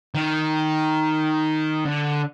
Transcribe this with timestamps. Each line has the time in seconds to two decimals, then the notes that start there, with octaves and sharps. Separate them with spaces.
0.15 D#3
1.85 D3